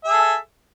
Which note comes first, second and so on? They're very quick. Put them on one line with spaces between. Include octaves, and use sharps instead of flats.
E5 G#4 A4